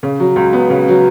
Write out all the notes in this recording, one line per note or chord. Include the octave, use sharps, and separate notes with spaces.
C#3
F#3
C#2
B3
C#3
F#3